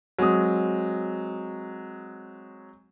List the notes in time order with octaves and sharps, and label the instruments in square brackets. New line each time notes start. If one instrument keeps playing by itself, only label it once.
[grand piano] F#3 G#3 C4 D#6